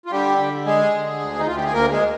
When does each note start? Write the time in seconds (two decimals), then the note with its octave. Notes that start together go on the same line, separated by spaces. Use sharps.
0.06 F4
0.11 D3 G3 G4
0.38 D3
0.65 G#3 G#4
0.93 D3
1.20 D2
1.39 D#4
1.47 D2 F4
1.56 G4
1.65 G#4
1.73 D2 A#3 A#4
1.91 G#3 G#4